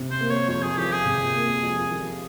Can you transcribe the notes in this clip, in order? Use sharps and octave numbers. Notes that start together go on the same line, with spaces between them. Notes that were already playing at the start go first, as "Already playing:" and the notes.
Already playing: C3
C5
A#3
C#5
F2 C#5
G#4
F3 G4
G#4
C3
A#3
F2
F3